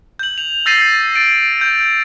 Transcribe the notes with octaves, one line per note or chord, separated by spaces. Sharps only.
G6 F#7
F7
E6 G6 A6 A#6 C7 D#7
A6 D7
G6